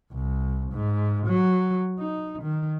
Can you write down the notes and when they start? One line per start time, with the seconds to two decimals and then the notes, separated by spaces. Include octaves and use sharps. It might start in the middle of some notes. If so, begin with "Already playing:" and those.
0.12 C2
0.72 G#2
1.27 F#3
1.99 D#4
2.42 D#3